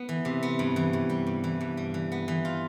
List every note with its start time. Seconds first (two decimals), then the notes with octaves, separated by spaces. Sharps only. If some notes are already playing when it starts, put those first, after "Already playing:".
Already playing: B3
0.09 E3
0.25 C3
0.43 B3
0.59 G2
0.76 E3
0.93 G2
1.10 G3
1.27 G2
1.44 E3
1.61 G2
1.77 G3
1.94 E3
2.12 B3
2.28 E3
2.45 F4